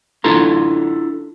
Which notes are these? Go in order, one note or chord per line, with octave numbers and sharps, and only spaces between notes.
D4 E4 F4 A4 A#5 C6